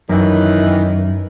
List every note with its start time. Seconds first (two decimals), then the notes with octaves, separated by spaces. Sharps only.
0.09 F#2 D#3 E3